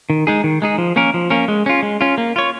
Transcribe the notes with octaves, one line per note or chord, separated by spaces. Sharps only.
D#3
G#3 D#4 G#4
D#3
G#3 D#4 G#4
F3
A#3 C#4 A#4
F3
A#3 C#4 A#4
G#3
C#4 F4
G#3
C#4 F4
A#3
F4 C#5